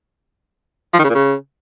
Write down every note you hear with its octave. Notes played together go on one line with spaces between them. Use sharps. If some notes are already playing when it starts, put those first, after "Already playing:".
F3
D#3
C#3
A#2
C#3